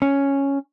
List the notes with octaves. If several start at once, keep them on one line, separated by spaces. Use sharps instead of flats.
C#4